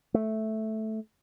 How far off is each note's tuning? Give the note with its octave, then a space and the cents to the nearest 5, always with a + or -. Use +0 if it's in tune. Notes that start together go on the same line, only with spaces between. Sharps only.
A3 -5